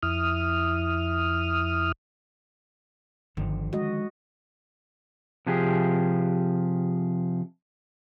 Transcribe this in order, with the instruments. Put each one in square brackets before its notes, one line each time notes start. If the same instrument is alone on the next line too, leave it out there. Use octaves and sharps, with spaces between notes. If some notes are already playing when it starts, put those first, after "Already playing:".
[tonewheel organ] F2 E4 D#6 F6
[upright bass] G1 [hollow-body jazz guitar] D3 D#3 F3
[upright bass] G#3 [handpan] F#4 D#5
[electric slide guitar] C3 F3 G4 G#4